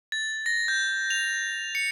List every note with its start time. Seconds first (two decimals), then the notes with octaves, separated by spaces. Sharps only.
0.12 A6
0.46 A#6
0.68 G6
1.10 F7
1.75 C#7